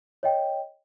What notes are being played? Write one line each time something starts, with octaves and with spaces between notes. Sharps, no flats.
C#5 D#5 G5